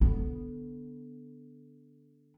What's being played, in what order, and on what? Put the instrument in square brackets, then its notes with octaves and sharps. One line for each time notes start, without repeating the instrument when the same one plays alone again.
[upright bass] D3 B3